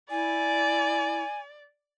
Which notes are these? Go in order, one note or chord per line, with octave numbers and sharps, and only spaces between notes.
E4 D5 G#5